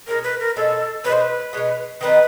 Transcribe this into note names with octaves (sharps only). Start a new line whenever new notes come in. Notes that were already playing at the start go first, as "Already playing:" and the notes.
B2 G#3 C#4 A#4
B4
A#4
B2 G#3 C#4 A4
B2 G#3 C#4 B4
C5
B4
B2 G#3 C#4
D#3 G3 C4 D#4 B4